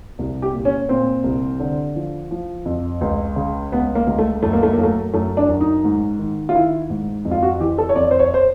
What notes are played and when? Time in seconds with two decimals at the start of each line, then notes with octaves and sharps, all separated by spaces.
0.19 C2
0.42 G4
0.53 A#2
0.65 C#4
0.89 A#2 C4
1.24 C2
1.60 D3
1.96 F3
2.31 F3
2.65 F2
3.01 C#2
3.36 C#3
3.72 C#2 B3
3.95 A#3
4.07 C#2
4.18 A3
4.43 F#2 A3
4.53 A#3
4.63 A3
4.73 F#2 A#3
4.83 A3
5.14 F#2 A3
5.37 D4
5.49 F#2
5.61 D#4
5.84 G#2
6.19 D#3
6.49 F4
6.55 D#3 E4
6.90 G#2
7.25 F2
7.31 F4
7.43 F#4
7.60 E3 G4
7.78 A4
7.89 C#5
7.96 F2 D5
8.11 C5
8.19 C#5
8.34 C5